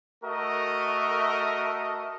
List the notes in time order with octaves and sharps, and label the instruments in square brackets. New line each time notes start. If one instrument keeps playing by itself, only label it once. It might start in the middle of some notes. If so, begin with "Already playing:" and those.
[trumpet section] A3 F#4 A4 A#4 D#5 E5